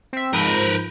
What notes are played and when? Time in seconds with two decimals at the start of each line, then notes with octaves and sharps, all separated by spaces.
0.13 C4 E5
0.33 G#2 F3 A#4 B4 G6